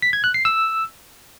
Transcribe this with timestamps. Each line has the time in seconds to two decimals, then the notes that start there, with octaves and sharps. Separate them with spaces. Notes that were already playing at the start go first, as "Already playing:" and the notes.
0.02 B6
0.13 G#6
0.24 F#6
0.34 C7
0.45 E6